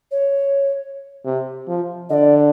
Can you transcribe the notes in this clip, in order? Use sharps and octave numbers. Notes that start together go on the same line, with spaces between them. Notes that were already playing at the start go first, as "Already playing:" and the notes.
C#5
C3
F3
D3 D5 D#5